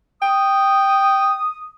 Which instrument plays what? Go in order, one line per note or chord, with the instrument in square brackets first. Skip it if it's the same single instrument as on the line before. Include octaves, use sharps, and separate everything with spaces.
[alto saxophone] G5 [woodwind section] D#6